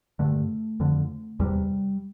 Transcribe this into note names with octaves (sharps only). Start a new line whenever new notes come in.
G2 D3 A3
F2 D3
E2 C3 G3